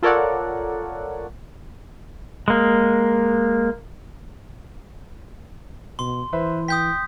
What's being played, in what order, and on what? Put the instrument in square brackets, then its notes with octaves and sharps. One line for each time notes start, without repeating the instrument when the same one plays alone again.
[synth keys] F4 A4 A#4 C#5 D5 F#5
[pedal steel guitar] G#3 A#3
[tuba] B2 [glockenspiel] C6
[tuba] E3 [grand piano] B4 C5 E5
[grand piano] G5 [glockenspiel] D#6 G6 B6